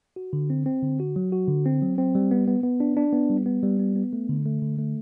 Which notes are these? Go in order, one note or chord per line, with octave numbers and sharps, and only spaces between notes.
F#4
D3
C4
C4
D3
F#4
F#3
F#4
D3
C4
F#3
C4
G3
B3
B3
B3
D4
D4
B3
G3
B3
G3
B3
B3
A3
D3
A3
D3
A3